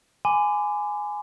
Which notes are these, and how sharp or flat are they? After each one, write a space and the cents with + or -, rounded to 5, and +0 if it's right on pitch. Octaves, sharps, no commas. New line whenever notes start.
G#5 +0 B5 +45 D6 +0